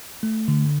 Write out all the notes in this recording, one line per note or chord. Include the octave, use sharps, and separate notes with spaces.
A3
D3